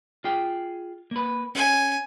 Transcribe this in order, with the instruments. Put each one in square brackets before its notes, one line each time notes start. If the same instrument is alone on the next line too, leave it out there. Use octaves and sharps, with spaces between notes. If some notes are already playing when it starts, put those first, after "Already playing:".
[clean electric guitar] F4 G#4 G5
A#3 B4
[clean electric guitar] C#4 [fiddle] G#5